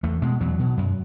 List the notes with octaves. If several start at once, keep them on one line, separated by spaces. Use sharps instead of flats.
E2 A3
B2 G#3
E2 F#3
B2
F#2